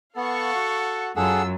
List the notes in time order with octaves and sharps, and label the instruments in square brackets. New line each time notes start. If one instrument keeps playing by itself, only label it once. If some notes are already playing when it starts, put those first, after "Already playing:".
[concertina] B3 [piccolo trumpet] A4 [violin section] F5 F#5 C#6
[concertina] F#4
[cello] F#2 [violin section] F4 E6 [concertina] G#4 A4 F#5